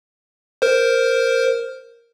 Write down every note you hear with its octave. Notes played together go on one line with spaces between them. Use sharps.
A#4 C5